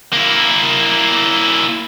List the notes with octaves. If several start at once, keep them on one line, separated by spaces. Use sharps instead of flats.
A#3 E4